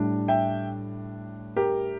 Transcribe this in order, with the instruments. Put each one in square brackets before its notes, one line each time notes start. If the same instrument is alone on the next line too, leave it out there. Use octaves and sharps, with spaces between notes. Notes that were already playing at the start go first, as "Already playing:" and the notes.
Already playing: [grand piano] A2 G3 D4
E5 G5
G4 A#4